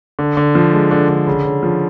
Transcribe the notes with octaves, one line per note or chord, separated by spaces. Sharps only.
D3
D3
F3
G#3
D3
D3
C#3
C#3
F3